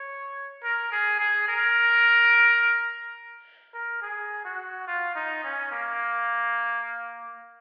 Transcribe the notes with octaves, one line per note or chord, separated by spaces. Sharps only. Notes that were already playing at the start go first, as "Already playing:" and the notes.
Already playing: C#5
A#4
G#4
G#4
A#4
A#4
G#4
F#4
F4
D#4
C#4
A#3